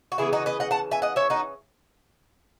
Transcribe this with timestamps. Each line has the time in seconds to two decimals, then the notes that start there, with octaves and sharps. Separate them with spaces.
0.12 F#4
0.18 C#3 E3 B3 E4 G#4
0.33 D#4 F#4
0.46 B4 D#5
0.60 D#5 F#5
0.71 F#5 A5
0.91 E5 G#5
1.02 D#5 F#5
1.16 C#5 E5
1.30 D#4 F#4